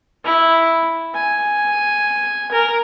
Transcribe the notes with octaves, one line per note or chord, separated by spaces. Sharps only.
E4
G#5
A#4